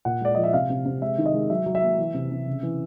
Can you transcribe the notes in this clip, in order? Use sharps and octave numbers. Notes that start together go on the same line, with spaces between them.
A#2 F#5
G#3 D5
F3 D#5
E5
C3 F5
C3
C3
G#3 E5
D#3
D#5
G#3
F#3 E5
F#3
E5
A#3
E3
C3
C3
C#3
E3